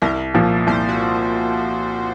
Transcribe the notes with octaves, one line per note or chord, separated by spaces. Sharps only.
C2 A#4
A#2 F3
C2 C5
F#4